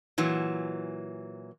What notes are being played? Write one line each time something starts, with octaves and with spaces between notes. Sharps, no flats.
A#2 E3 F#3